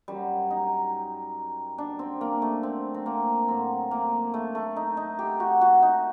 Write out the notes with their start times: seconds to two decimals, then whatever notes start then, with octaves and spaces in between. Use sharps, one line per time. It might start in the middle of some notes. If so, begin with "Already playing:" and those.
0.08 F#2 F#3 G3
0.50 D#4
1.78 D4
1.99 C4
2.21 A#3
2.42 A3
2.63 C4
2.94 C4
3.06 A#3
3.48 A2 F#3 C4
3.91 A#3
4.34 A3
4.55 A3
4.76 D#4
4.97 D#4
5.19 G4
5.40 F#4
5.61 F#4
5.82 D#4